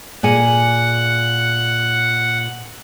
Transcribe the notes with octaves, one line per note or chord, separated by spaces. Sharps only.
A#2 G#4 F#5 G#5